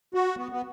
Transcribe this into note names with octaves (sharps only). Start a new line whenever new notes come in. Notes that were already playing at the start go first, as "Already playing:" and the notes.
F#4
B3
B3